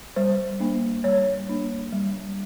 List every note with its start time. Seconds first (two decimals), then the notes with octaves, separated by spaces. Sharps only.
0.16 G3 C5
0.60 A#3 D4
1.04 G3 C#5
1.49 A#3 D4
1.93 G3